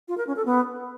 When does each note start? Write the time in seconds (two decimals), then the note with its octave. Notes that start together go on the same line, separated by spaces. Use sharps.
0.08 F4
0.18 A#4
0.27 C#4
0.36 A4
0.46 B3